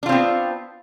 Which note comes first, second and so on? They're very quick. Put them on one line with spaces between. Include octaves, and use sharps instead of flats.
D4 F4 C4 B3